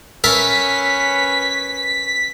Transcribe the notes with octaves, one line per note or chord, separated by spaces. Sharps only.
C#4 A#4 B4 E5 A5 B6